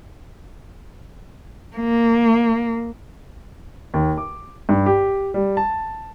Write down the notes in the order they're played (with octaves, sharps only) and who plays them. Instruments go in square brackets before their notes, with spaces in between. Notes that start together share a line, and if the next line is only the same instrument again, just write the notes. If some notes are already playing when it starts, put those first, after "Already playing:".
[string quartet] A#3
[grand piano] D#2
D6
G2
G4
G3
A5